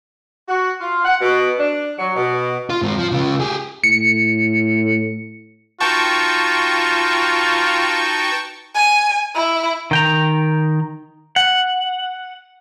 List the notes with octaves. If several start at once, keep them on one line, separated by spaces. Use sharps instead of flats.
F#4
F4
F#5
B2
D4
F#3
B2
F4
G#2 C4
F3
C#3 F4
G4 G#4
A2 C#7
D#4 F4 F#4 B4 G5 A5 C#6
G#5
E4
D#3 G5 A#5
F#5